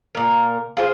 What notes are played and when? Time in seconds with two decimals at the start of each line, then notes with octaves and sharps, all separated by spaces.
0.15 A#2 A#4
0.77 F4 G#4 C5